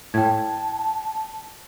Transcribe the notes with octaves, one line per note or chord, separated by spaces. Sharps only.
A2 G5 A5 G#6